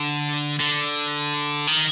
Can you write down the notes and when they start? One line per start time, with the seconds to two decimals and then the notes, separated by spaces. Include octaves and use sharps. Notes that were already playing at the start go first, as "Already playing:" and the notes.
Already playing: D3
0.60 D3
1.67 D#3